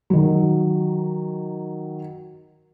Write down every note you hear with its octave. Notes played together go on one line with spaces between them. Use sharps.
D#3 F#3